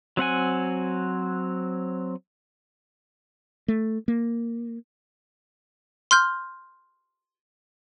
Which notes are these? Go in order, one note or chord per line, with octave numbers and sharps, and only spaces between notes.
F#3 C4 F#5 G#5
A3
A#3
C6 F6 G6